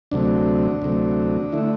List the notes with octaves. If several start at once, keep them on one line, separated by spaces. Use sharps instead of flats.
D2 C3 F#3 A3 D4
D2 C3 F#3 A3
D3 A3 E4